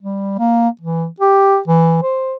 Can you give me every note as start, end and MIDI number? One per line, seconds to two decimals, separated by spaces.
0.01 0.34 55
0.38 0.68 58
0.81 1.06 52
1.20 1.58 67
1.68 2.02 52
2.03 2.34 72